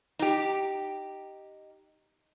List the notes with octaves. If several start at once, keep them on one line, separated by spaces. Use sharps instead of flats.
D#4 G4